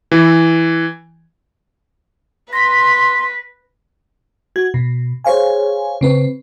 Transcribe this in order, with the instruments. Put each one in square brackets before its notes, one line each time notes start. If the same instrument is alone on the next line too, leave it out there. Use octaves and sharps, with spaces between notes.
[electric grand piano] E3
[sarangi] B4 [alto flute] C6 [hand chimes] A#6 B6
[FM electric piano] F#4 G#6
B2
G#4 C5 C#5 F5 G#5
C#3 C4 B4